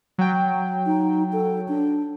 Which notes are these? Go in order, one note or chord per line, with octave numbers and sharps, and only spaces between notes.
F#3 G5
D#4
A4
D4